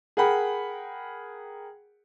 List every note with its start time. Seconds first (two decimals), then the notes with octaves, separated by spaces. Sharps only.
0.17 G#4 A#4 F#5 G5 B5